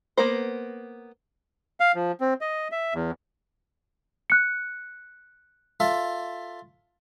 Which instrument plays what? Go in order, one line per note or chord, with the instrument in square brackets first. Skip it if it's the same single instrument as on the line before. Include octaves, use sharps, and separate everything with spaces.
[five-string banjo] A#3 B3 A#4 C5
[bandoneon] F5
F3
C4
D#5
E5
E2
[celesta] F#6 C#7
[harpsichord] F4 A4 E5